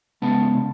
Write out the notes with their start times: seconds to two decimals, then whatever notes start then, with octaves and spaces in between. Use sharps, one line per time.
0.22 C#3 G#3 B3 F#5 A5
0.57 C#3